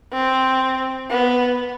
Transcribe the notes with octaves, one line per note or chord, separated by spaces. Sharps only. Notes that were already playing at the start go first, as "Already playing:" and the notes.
C4
B3